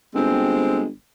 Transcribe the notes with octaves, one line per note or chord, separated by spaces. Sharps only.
G1 G#3 C4